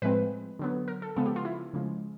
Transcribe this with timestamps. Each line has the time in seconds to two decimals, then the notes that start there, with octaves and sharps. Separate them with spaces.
0.02 A2 F3 G#3 C4 B4
0.59 D3 F#3 B3
0.88 A#4
1.02 A4
1.17 C#3 F3 G#3 B3 A4
1.26 G4
1.36 F4
1.45 E4
1.73 C#3 F3 G#3